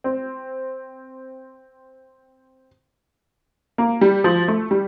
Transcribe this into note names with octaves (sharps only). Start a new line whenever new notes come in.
C4
A#3
G3
F3
A3
G3